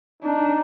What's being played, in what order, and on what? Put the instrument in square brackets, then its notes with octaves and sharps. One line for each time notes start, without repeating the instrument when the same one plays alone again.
[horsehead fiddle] D4 [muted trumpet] D#4